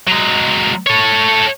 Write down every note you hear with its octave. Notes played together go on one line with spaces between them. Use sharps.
F#3 G#3
A4 C#5